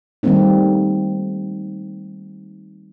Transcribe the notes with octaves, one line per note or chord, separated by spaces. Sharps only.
D#3 G3 A3 A#3 C4 D#4